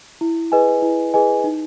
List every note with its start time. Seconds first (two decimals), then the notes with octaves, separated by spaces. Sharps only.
0.21 E4
0.52 G#4 B4 D#5 G#5
0.82 E4
1.14 G#4 B4 D#5 G#5
1.44 D#4